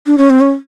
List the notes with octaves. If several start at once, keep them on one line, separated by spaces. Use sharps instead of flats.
D4
C#4
C4
C#4